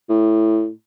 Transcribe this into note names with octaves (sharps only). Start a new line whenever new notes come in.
A2